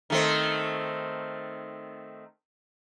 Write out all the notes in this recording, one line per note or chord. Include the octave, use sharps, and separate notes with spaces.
D#3 A3 C4